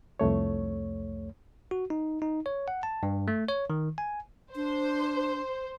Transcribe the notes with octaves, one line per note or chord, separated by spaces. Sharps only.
C2 F2 A3 C#5
F#4
D#4
D#4
C#5
F#5
A5
G2
A3
C#5
D#3
G#5
D4 C5